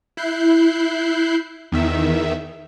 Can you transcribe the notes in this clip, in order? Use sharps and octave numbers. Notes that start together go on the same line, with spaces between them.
E4 F#6 G6 C7
E2 D#3 E5